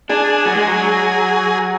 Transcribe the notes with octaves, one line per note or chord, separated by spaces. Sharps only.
D4 G#4
F#3
G#3
F#3